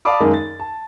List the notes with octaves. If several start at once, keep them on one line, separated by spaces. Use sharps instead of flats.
D5 F5 A5 B5 D6 D#6
F#2 D#3 G#3 A#3 D#4
A6
A5